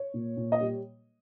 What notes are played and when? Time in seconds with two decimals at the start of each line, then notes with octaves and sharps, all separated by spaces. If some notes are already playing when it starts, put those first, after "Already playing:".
Already playing: C#5
0.14 A#2
0.37 A#2
0.52 D#5
0.61 G3